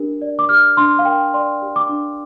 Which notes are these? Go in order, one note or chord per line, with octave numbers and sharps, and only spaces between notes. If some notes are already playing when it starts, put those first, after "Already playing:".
Already playing: D4 G4 A#4
D5
D6
G4 F6
D4 C6
F5
A#4 G5
D5 C6
G4
D6
D4